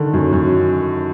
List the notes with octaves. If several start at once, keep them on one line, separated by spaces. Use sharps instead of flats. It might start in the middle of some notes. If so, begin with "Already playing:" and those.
Already playing: D3 D#3
F#2
F#2